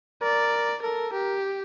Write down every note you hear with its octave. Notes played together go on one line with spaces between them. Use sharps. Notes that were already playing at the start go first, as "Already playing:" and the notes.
A#4 D5
A4 A#4
G4 A#4